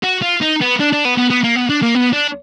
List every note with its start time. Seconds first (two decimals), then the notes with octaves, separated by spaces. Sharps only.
0.03 F#4
0.22 F4
0.41 D#4
0.61 B3
0.80 D4
0.93 D4
1.05 B3
1.17 B3
1.30 B3
1.44 A#3
1.56 B3
1.70 D4
1.82 A#3
1.95 B3
2.13 D4